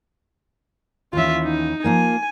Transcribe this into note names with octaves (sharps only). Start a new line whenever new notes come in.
D#2 E3 C#4 F4 E5
D#4
F3 A#3 A#4 G#5